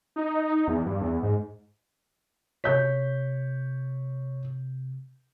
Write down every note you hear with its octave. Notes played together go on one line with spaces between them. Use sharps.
D#4
E2
G2
E2
G#2
C3 C#5 G6 B6